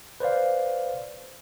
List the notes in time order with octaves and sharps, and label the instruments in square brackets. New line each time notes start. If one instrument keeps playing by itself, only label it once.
[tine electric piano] B4 C5 D5 F5